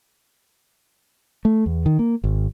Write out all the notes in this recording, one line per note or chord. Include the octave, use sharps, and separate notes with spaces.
A3
E2
D#3
A#3
G#1